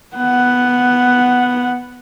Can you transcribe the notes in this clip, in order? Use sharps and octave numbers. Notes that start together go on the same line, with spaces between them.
B3 F#5